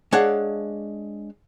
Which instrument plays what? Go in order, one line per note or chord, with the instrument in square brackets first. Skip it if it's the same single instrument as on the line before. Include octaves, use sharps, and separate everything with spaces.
[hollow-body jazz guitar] G#3 D4 C#5 F5 F#5